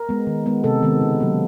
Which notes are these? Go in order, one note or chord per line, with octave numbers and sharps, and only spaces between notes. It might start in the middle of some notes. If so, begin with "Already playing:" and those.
Already playing: A#4
G#3 B3
D#3
G#3 B3
C3 A4
D#3 G#3 B3
C#3
F#3 A#3